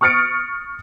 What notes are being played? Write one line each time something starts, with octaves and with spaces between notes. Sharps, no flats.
C#6 D#6 F6 A6 C#7 D7